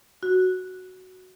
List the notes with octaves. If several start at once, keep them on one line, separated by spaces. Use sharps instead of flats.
F#4